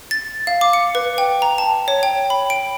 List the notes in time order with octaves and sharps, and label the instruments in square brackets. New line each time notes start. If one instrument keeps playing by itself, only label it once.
[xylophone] A6
F5
D6
C#7
B4
G5
A#5
A5
C#5
G5
B5
D7